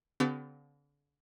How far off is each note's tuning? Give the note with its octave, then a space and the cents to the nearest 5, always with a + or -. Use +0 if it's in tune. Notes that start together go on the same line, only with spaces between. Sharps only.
D3 -40 B3 +40 G4 -40